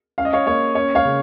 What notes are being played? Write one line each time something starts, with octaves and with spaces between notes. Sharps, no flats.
C#4 F5
D#5
C#5 F5
A#3 C#5
C#4 C#5
C#5 F5
C#3